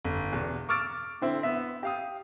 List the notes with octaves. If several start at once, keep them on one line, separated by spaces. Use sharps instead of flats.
G1
E2 B2
C#6 D6 E6 F6 A6 D7
D3 C4 E4
B3 E5
G4 F5 D#6